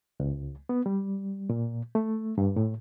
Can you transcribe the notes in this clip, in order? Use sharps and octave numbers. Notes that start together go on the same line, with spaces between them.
C#2
B3
G3
A#2
A3
G2
A2